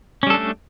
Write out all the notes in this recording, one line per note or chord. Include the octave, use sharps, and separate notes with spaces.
G3 A3 C#4 D4 A4